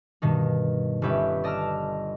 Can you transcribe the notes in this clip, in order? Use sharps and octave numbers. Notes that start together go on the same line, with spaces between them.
G2 B2 D#3 D#4
G1 G3 C#4 G4 B4 E5
D5 D#5 A5 A#5 E6 F6